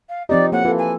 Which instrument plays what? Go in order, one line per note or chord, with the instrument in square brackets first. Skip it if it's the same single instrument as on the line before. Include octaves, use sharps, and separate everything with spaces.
[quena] F5
[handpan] F3 C4 G4 [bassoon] D#4 [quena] D5
[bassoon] A2 [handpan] A#3 [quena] F#5
[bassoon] E3 [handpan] F4 A4
[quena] G#5